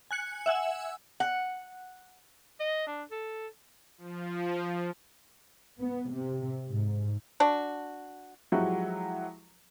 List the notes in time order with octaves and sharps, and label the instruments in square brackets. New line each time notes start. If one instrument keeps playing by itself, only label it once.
[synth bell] G#5 F#6 C#7
E5 F#5 G#5 E6
[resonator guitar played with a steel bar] F#5
[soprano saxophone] D#5
D4
A4
[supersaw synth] F3
[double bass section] B3
C3
G#2
[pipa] D4 F#4
[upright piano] F3 F#3 G#3 E4 F#4 G4